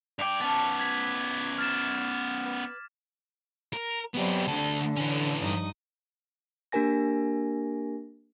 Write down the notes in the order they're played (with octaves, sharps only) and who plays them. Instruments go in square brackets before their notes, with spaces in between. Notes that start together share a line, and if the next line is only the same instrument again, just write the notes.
[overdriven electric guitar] G2 G5 [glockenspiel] D6 F7
[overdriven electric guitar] B3 C#4 [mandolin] A5
[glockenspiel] G#6 B6
F6 A6 E7
[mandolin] B4
[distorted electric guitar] A#4
[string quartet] F#3 G3 C4 [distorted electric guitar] B3 G4
[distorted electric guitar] D2 A4 [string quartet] D3
[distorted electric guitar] E3 C#4
[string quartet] G2 D#4 D#6
[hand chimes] A#3 D4 G4 A#4 G#5 A#6